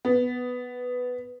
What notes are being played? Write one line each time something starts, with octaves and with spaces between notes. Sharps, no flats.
B3